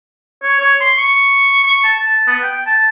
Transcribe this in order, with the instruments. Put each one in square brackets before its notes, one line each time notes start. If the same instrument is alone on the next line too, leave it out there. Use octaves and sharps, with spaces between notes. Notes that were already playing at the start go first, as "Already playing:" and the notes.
[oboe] C#5
C#5
C6
C#6
C#6
A5
A5
B3
G5
A5